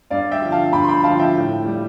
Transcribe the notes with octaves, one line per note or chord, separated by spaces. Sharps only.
G2 D5 F5
E5 G5
D3 F3
F5 A5
G2 G5 B5
C6
G5 B5
D3 F3 F5 A5
E5 G5
A2
G3